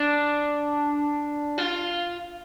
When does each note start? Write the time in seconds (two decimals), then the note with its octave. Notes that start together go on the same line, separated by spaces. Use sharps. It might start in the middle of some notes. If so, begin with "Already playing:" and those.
Already playing: D4
1.58 F4